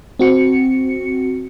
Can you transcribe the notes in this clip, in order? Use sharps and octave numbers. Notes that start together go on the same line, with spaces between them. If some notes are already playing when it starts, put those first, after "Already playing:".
C4 F#4 C#7